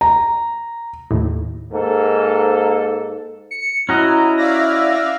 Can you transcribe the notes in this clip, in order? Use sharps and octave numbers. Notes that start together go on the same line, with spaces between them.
A#5
D#2 A2
G#2 A#3 A4
C#7
C#4 E4 F#4 D#5 A#5
D5 E5 F5 A#6